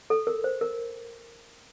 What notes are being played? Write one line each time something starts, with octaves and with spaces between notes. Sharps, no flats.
A4
A#4
C5
A#4